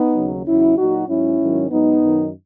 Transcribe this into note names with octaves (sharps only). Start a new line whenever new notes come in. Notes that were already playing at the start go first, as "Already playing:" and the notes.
Already playing: B3 D#4
D#2 C#3 F#3
E2 C#3 F#3 C#4 E4
A#2 F#3 D#4 F#4
G#2 F#3 C#4 E4
G#2 D#3 F#3
G#2 F#3 B3 D#4
F#2 D#3 F#3